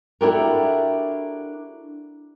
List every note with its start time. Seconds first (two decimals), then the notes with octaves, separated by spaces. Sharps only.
0.21 D4 E4 F#4 G4 A4 A#4